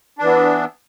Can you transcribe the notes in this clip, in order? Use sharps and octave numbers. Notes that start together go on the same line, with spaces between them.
E3 B3 D4